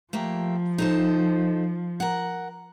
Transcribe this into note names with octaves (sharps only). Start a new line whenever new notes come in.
F3 A3 A#3 G4
D#4 A4 C5
A#4 F#5